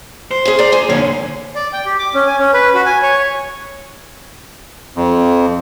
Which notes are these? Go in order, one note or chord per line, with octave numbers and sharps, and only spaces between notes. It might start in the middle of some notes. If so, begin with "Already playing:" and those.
C5
C#4 G#4
D5 A#5
D2 G#5
D3 A#3 C#5
D5
G5
G4
D6
C#4
G#5
C#4
B4
F#4
G#5
C#5
F2